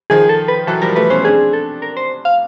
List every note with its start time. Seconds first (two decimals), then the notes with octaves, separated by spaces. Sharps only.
0.10 D#3 F3 G#4
0.29 A4
0.48 B4
0.67 E3 F#3 A4
0.82 F3 G3 A#4
0.96 G3 A3 B4
1.10 B3 C#4 C5
1.25 C4 D4 G#4
1.53 A4
1.82 A#4
1.97 C5
2.25 F5